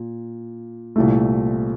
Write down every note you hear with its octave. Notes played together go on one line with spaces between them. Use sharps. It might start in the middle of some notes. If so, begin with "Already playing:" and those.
Already playing: A#2
C2 A#2 A3